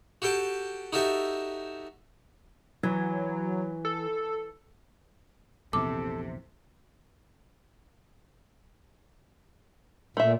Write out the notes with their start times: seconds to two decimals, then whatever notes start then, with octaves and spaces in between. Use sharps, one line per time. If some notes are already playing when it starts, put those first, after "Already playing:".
0.22 F#4 G4 A4 G5 A5
0.93 D#4 F#4 G4 A4 E5
2.83 E3 F#3
3.85 A4
5.73 A#1 E2 C3 A4 D6
10.17 A#2 A3 E5